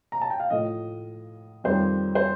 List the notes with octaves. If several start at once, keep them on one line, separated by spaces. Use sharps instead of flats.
A#5
A5
G5
F5
A2 F3 D#5
F2 D#3 G3 C5
C5